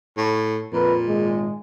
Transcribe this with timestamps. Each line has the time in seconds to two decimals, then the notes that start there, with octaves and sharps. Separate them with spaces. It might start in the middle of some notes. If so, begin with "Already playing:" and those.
0.17 A2
0.73 F2 A#2 A#4 B4
1.06 G#1 G#3